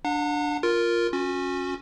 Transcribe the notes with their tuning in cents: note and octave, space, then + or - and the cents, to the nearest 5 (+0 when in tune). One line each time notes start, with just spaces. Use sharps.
D4 +0 F#5 -35 A#5 -45
F4 +0 A#4 +0
C#4 -10 F#4 -35